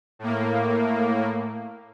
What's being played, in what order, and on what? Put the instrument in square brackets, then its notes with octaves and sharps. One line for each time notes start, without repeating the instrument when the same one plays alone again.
[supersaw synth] A2 A#3